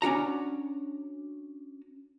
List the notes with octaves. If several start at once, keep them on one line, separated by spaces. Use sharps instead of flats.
C#4 D4 F#4 A#5